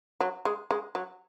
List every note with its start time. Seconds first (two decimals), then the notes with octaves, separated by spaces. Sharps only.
0.20 F#3
0.45 G#3
0.71 G#3
0.95 F#3